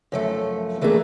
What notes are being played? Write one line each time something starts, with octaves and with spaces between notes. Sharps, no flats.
F#2 F3 A3
E3 A3 A#3 D4 G#4